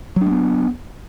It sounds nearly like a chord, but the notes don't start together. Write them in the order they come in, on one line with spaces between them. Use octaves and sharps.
F#3 D4 A3 B3